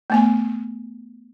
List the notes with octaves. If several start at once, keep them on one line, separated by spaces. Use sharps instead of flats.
A3 B3 G#5